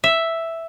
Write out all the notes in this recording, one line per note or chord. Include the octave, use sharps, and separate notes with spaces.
E5